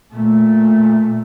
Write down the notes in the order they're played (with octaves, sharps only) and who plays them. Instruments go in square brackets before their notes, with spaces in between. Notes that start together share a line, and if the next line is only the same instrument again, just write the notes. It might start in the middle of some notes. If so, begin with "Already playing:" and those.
[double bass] A#2 A3